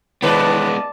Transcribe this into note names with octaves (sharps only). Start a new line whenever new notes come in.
A2 D#3 G#3 B3 B4 D5 A5